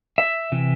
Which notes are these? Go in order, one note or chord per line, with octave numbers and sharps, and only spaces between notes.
E5
C3 E3